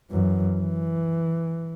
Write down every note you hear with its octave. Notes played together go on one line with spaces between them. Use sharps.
F#2 E3
E3